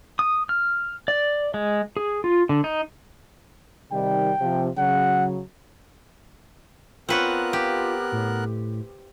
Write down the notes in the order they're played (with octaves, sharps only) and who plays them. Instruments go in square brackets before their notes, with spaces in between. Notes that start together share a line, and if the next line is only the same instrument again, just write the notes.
[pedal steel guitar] D#6
F6
D5
G#3
G#4
F4
D3
D#4
[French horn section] C3 D#3 G3 [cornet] G5
[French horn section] C3 F3
[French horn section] C#3 F#3 [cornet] F#5
[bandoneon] B3 A#4 F#6 [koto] C4 B4 C#5 [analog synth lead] F4
[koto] G4
[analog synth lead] A2